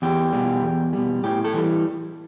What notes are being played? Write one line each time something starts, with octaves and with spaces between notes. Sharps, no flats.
E2 G4
B2 G3
E2
B2 G3
A2 G4
A4
E3 G3